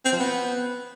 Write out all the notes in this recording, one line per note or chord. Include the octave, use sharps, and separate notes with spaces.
C4
F3
B3